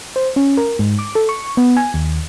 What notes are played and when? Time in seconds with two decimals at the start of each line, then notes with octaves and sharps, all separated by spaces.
0.16 C5
0.36 C#4
0.57 A#4
0.79 G#2
0.99 D6
1.15 A4
1.29 C#6
1.57 B3
1.77 G#5
1.94 D#2